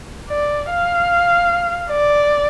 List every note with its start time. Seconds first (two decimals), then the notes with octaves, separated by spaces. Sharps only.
0.29 D5
0.70 F5
1.91 D5